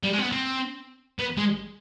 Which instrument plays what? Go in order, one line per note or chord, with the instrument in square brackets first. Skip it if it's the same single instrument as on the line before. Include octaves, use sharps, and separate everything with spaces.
[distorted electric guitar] G3
G#3
C4
B3
C4
B3
G#3